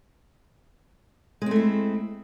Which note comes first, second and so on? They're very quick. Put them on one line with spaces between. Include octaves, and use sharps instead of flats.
G#3 C4 A3 E4